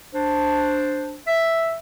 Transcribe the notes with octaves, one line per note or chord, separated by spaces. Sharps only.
D4 C5
E5